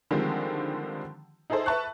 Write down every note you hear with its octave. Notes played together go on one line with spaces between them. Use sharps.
D3 D#3 F3 G3 G#3 C4
D#4 E4 G#4 A4 C5
B4 E5 A5 C#6 F#6